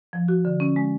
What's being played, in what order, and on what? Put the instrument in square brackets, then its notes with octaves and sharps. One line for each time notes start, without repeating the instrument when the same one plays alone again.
[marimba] F3
F#4
D3
C#4
G#3